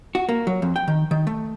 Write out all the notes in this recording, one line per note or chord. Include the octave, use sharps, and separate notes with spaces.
F#4
A#3
F#3
F2
G5
D#3
D#3
A3